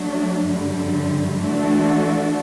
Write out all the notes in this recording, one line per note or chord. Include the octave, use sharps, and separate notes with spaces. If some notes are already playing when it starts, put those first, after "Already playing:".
Already playing: F#3 A3 D4
F#2 D3 G3
E3 A3 D4 F#4 A4